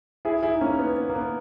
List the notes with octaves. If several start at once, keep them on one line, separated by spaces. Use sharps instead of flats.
E4 G#4
E4 G#4
D#4
A#3 C#4
B3
B3
A#3
B3